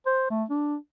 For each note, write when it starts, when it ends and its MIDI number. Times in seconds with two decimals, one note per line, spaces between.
0.06 0.26 72
0.30 0.44 57
0.50 0.76 62